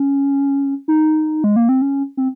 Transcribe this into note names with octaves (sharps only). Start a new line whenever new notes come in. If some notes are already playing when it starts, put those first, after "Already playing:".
Already playing: C#4
D#4
G#3
A#3
C4
C#4
C4